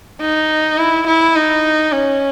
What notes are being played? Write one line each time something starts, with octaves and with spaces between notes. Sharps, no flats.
D#4
E4
E4
D#4
C#4